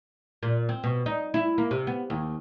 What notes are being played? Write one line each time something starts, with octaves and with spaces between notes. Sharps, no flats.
A#2
C4
B2
D#4
E4
A#3
C3
B3
D#2